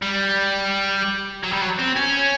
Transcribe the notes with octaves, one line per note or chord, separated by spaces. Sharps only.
G3
F#3
G3
F#3
C4
C#4